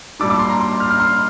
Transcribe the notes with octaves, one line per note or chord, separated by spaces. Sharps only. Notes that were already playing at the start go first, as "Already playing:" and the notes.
A#2 G3 D4 D6
D6
C6
A#5
C6
F6
F6
C6